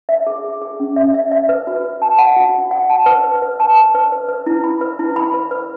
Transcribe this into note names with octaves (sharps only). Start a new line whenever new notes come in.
E5
G#4
G#4
G#4
C#4
E5
E5
E5
B4
F#4
B4
A5
F#5
F#4
F#4
F#5
A5
B4
B4
B4
A5
B4
B4
B4
B4
E4
B5
B4
E4
B5
B4
B4